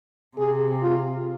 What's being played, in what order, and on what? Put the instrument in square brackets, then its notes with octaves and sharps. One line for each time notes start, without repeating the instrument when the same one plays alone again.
[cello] C3 [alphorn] G#4
[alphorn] F4